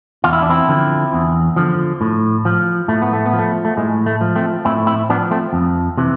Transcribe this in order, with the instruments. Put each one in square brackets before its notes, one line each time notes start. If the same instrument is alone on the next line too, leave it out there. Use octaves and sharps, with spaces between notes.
[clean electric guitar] E2 F4
E4
D4
C4 E4
D3 F3
E2
D3 F3
A2
F3
A2 A3
B3
A3
B3
F3
A3
A3
A2 G#3
A3
F3
A3 C4
A2 C4 E4
C4 E4
F3 B3 D4
A3 C4
F2
C3 E3